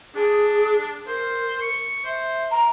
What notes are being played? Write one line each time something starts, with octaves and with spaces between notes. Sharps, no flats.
D4 G#4
A#4 C5
C#6
C5 E5
A#5